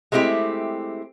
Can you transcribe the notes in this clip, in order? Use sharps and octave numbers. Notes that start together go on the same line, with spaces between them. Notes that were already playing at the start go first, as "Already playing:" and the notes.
G#3 A3 C4 E4 G4